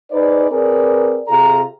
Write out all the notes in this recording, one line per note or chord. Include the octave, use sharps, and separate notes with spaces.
D#4 G#4 B4 C5 D5
C4 G#4 A#4 B4 D5
C3 F4 G#4 A4 A#5